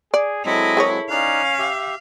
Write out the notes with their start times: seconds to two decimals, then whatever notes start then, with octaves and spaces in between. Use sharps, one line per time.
0.14 G#4 D5
0.45 F#3 G#3 C4 E4 A4 D#5
0.77 G#4 A#4 C#5
1.10 C#4 D#4 D5 F5 F#6
1.59 G4 E5